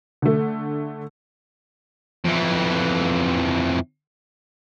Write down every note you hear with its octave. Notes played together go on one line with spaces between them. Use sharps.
D3 A3
F2 E3